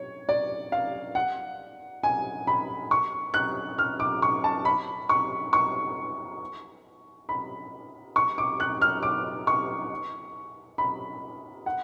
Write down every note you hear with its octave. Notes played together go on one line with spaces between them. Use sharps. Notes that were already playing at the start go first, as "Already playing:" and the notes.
Already playing: C#5
D5
F5
F#5
G#5
B5
C#6
F#6
F6
D6
C#6
A5
B5
C#6
C#6
B5
C#6
D6
F#6
F6
D6
C#6
B5
F#5